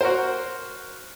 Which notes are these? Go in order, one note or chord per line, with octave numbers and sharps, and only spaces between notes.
F#4 A#4 C5